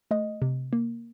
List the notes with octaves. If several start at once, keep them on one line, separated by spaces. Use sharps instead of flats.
A3 D#5
C3
A#3